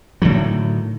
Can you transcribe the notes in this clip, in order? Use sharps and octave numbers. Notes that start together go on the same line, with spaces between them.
A2 D3 D#3 F#3